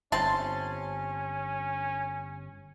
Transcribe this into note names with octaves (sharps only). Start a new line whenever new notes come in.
G1 C4 C#4 A5 C6